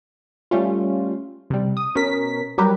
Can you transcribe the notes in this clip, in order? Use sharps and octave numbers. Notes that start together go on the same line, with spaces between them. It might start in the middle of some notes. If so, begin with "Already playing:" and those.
G3 A3 C#4 F4
C3 G3
D#6
B2 C#4 A#4 B6
F#3 G3 G4 A#4 B4